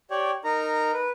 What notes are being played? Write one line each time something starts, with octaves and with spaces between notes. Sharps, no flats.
G4 C#5 D5
D#4 A#4 A#5
B4